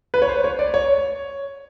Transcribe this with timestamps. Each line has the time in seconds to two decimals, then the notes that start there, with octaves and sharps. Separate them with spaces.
0.14 B4
0.22 C#5
0.29 C5
0.44 C#5
0.59 D5
0.74 C#5